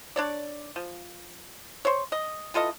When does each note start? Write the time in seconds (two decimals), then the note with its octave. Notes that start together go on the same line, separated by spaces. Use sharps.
0.16 D4 C#5 D5
0.76 F3
1.85 C5 C#5
2.12 D#5
2.54 E3 F4 A4 D#5